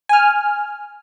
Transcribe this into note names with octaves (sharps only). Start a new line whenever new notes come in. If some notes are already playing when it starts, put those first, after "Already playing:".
G#5 F6